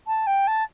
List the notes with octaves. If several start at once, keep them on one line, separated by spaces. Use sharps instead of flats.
A5
G5
A5